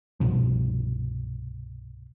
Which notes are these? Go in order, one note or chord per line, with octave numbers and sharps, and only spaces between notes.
G1 C2 B2 F3